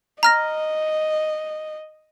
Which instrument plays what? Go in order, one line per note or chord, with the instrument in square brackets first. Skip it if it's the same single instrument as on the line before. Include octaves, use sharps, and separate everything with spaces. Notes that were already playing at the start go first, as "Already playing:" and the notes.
[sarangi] D#5 [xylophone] A#5 F6 A#6